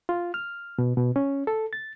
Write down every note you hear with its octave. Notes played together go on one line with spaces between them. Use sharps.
F4
F6
B2
B2
C#4
A4
A6